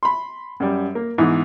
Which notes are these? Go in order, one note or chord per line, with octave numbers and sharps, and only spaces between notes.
B5 C6
F#2 G3
A#3
G#2 E3 B3